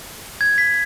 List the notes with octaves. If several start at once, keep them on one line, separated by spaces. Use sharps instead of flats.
G#6
B6